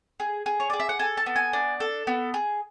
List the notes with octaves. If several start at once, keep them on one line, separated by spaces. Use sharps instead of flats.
G#4
G#4
C#5
G#4 D5
E5
F#5
A4 G#5
A5
B3
G#5
D4
A4
B3
G#4